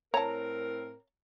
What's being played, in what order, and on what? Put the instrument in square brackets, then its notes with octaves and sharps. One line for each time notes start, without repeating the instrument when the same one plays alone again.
[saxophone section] A2 C4 A#4 [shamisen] C#5 A5 [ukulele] A#5